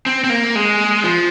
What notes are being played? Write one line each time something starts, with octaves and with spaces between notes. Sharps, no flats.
C4
C4
A#3
G#3
F3